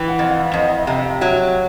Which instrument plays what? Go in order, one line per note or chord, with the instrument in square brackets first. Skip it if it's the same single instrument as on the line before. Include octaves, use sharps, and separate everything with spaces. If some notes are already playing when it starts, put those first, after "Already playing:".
Already playing: [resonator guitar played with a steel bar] E3 [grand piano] G5
[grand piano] F#5
[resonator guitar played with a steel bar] F2 [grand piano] F#5
[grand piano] F5
[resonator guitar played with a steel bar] F2 [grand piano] F#5
[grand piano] D#5
E5
[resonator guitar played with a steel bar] C3 [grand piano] F5
[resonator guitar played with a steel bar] F#3 [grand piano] E5